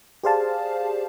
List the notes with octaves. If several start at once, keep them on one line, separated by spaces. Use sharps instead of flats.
G4 G#4 C5 D5 F5 A5